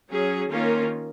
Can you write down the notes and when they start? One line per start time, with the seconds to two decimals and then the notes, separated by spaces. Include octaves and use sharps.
0.11 F#3 C#4 G#4
0.52 D#3 A#3 C#4 F4 A#4